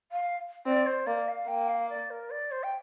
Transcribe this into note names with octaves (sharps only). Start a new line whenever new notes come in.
F5
C4 D5
C5
A#3 D5
F5
A#3 G5
F5
D5
A#4
D5
C5
G5